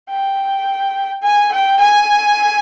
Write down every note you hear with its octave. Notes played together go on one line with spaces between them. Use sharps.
G5
G#5
G5
G#5